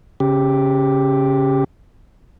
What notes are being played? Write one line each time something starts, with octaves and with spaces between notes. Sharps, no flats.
C#3 G4